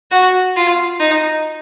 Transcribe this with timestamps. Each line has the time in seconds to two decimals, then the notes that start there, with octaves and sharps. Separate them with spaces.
0.11 F#4
0.56 F4
0.99 D#4